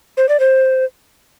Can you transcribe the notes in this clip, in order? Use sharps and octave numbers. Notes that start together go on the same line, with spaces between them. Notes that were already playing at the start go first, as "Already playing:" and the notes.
C5
D5
C5